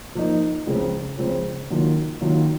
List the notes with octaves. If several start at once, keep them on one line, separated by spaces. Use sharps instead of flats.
F3 A#3 D#4
C#2 C#3 F3 C4
C#2 C#3 F3 C4
D#3 F#3 A#3 F4
D#3 F#3 A#3 F4